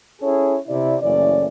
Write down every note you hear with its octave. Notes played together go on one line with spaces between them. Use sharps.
C#4 E4 G#4 A4 C#5
C3 E4 D5
F#1 E3 A3 C#4 D5